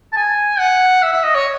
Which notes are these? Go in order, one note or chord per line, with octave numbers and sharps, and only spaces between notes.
A5
G#5
F#5
E5
E5
D#5
C#5